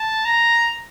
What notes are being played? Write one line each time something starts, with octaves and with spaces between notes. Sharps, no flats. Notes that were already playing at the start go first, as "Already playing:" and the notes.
Already playing: A5
A#5